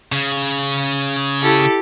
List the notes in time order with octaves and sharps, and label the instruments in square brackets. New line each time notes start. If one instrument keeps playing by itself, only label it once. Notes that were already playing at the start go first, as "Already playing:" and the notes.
[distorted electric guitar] C#3
[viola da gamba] E4 G4 A4